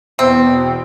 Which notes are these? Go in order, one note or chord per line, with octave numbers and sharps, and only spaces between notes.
E2 B2 C4